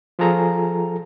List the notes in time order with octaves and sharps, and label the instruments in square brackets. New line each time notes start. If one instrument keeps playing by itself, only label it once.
[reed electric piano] F3 F4 G#4 A4 A#5